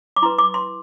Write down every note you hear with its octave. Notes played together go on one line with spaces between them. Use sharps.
D6
E4 B4 C6
D6
C6